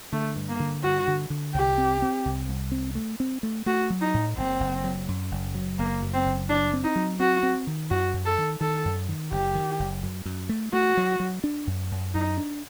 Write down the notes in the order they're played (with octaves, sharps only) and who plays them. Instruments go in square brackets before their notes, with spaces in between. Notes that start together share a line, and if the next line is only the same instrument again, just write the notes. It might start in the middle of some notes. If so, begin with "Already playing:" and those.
[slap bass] D3 [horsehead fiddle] A3
[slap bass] G2
[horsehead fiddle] A#3
[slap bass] D3
[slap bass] G2 [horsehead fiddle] F#4
[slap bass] D3
D3
[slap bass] C2 [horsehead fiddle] G4
[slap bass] C4
C4
C2
C2
C4
A3
C4
A3
[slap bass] A3 [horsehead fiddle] F#4
[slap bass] F#3
[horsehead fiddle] D#4
[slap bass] A2
[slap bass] F#1 [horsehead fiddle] C4
[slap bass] F#1
F#3
F#2
F#1
F#3
[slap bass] F#1 [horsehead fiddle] A#3
[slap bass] F#2
[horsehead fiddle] C4
[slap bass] F#1
[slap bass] F#3 [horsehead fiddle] D4
[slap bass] C4
[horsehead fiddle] D#4
[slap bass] F#3
[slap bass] C4 [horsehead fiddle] F#4
[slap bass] C4
D#3
[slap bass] F#2 [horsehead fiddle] F#4
[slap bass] F#2
[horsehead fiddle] A4
[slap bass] D#3
[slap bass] D#3 [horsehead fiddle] A4
[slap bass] F#2
D#3
[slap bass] F#1 [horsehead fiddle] G4
[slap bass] D#3
F#1
F#2
F#2
A3
[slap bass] A3 [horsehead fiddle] F#4
[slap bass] F#3
F#3
D4
F#2
F#2
[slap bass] F#2 [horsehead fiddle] D#4
[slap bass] D4